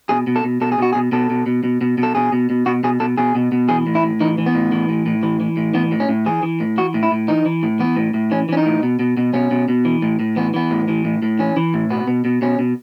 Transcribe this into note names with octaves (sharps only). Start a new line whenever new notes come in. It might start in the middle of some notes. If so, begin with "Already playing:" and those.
B2 G#4
B2
A4
B2
B2 A4
G#4
B2 F#4
G#4
B2
B2 A4
B2
B2
B2
B2
B2
A4
B2 G#4
B2
B2
B2 F#4
B2 G#4
B2 A4
B2 G#4
B2
B2
E3 G#4
A2
E4
A2
E3 D#4
E3
B3
A2
E3
A2
A2
E3
E3
A2
E3 B3
A2
C#4
A2
E3 G#4
E3
A2
E3 F#4
A2
E4
A2
E3 D#4
E3
A2
E3 B3
A2
A2
E3 C#4
E3 C#4
D#4
A2
B2
B2
B2
B2 C#4
B2
B2
E3
A2
A2
E3 B3
E3 B3
A2
E3
A2
A2
E3 C#4
E3
A2
B2 B3
B2
B2
B2 C#4
B2